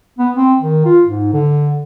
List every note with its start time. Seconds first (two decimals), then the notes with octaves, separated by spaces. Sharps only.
0.19 B3
0.37 C4
0.60 D#3
0.86 F4
1.06 G#2
1.33 D3